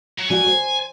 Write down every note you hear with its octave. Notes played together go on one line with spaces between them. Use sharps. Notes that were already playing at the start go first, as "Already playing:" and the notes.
F#3
G3 F#4 D5 G#5
C5